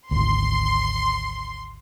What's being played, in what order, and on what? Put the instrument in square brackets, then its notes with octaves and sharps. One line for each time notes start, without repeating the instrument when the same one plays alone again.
[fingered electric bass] G#1 D2 [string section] C6